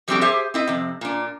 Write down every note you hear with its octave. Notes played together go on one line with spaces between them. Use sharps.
F3 G3 A3 C4 F#4 G4
G4 G#4 C5 E5
C4 E4 D#5
F2 C3
A#2 D4